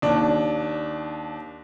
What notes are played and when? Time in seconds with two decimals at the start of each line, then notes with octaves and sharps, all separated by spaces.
0.02 D#2 D4